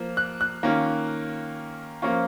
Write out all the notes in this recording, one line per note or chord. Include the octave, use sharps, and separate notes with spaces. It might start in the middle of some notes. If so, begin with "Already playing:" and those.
Already playing: F3 A#3
F#6
F#6
D#3 A#3 C#4 F4
F3 A#3 C#4 F4 C#6